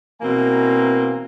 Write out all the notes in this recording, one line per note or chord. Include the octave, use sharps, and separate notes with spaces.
B2 E3 A#3 C4 G#5 A#5